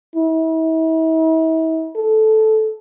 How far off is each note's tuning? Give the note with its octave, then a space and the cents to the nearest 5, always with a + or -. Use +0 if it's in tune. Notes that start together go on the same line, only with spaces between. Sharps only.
E4 -40
A4 -10